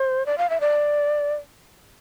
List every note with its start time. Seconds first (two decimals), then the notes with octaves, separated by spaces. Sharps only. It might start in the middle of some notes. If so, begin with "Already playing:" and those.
Already playing: C5
0.26 D5
0.38 F5
0.49 E5
0.60 D5